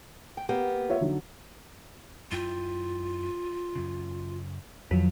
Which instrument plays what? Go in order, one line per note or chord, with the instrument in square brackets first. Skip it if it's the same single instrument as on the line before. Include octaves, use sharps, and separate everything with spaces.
[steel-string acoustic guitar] G5
A#3 B3 G4
[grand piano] F4 C#5 E5
D3 F#3 D#4
[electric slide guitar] F#2 E4 G5 [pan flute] F4
[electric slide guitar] F#2 C#3
[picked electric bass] F2 [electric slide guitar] D#3 E4 B4 [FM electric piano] F#3